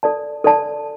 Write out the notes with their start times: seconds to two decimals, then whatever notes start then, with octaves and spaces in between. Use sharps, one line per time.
0.03 A4 D5 A5
0.44 A4 D5 A5